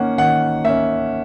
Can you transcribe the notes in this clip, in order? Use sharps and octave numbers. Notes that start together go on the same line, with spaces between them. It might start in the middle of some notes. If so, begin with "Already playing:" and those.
Already playing: D#3 A#3 C#4 F#5
D#3 F#5
A#3 C#4 E5